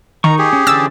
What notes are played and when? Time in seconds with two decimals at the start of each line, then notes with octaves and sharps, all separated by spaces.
0.24 D#3 D#4 A#5 C#6
0.38 G4 G#4
0.53 C#4
0.67 D3 E3 C#4 E6 A6